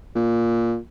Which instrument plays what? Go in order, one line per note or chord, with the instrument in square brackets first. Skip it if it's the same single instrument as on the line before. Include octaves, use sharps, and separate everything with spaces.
[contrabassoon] A#2